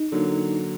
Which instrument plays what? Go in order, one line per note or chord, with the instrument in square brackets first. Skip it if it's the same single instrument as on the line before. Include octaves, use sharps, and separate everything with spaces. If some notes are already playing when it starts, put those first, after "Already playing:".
Already playing: [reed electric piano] D#4
[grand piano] D3 F#3 A#3